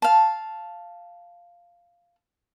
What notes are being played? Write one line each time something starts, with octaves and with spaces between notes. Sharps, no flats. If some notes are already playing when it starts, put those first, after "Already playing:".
F5 A5